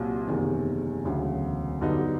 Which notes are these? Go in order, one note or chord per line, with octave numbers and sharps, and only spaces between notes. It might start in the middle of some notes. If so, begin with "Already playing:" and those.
Already playing: C2 A#2 F#3
F#1 E2 C3 D#3
E1 D2 C#3 F#3
G2 D3 F#3 B3 D#4